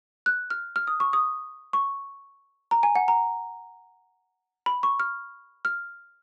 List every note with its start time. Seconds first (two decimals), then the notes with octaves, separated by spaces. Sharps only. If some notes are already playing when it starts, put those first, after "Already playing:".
0.26 F#6
0.50 F6
0.76 F6
0.87 D#6
1.00 C#6
1.13 D#6
1.73 C#6
2.71 A#5
2.83 G#5
2.95 F#5
3.08 A#5
4.66 B5
4.83 C#6
5.00 F6
5.65 F6